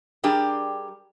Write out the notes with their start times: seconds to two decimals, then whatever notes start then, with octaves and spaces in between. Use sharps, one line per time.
0.24 G3 D4 G4 G#4 A#4